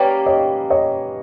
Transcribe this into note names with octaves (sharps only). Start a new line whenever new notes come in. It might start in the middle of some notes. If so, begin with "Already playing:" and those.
Already playing: G3 A#3 C#4 B4 C#5
C#5 D#5
C#5 D#5